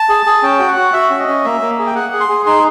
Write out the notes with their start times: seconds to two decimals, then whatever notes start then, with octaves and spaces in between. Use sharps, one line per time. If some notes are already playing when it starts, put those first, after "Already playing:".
Already playing: A5
0.09 G#4
0.26 G#4
0.43 C#4 G5
0.59 F#4
0.68 F#5
0.76 F#4
0.93 F#4 E5
1.10 C#4
1.19 D#5
1.28 C#4
1.44 A#3 E5
1.61 A#3
1.79 G#4
1.86 G5
1.95 G#4 F#5
2.13 G#4
2.20 C6
2.29 G#4
2.46 D#4 C6